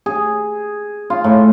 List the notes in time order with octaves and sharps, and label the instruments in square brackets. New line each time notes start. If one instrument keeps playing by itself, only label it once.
[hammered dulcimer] G#4
F4
A2